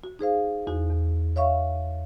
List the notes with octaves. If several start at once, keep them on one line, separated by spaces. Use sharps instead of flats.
F#4
D#4 G#4 C5 F5
E2 D#4 F#4
E2
C#5 E5 F5 C#6